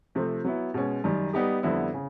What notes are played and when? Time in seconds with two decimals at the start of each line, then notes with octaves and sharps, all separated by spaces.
0.15 C3 F3 A3 C4
0.45 F#3 B3 E4
0.74 B2 G#3 C#4
1.04 F#2 D#3 G3
1.33 G3 B3 D#4 G4
1.63 F2 D3 G3 B3 E4
1.94 C#3